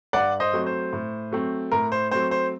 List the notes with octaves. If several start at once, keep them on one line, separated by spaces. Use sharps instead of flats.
G2 D5 F#5
C5 D#5
F#3 A3 C4
C5
A2
F#3 A3 C4
A2 A#4
C5
F#3 A3 C4 C5
C5